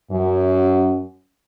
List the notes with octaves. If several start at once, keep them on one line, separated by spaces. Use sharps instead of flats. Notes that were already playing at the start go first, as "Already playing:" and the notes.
F#2